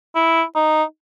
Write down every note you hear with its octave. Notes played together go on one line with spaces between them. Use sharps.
E4
D#4